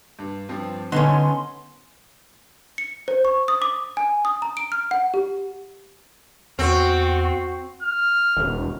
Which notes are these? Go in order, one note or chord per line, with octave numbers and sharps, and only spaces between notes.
G2
G2 F3 C4
D3 B3 C#4 D#4 C6
C#7
C5
C#6
D#6
D6
G#5
D#6
A#5
D7
F6
F#5
G4
E2 C4 F#4
F6
E1